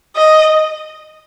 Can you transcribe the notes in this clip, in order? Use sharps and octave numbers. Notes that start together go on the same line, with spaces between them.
D#5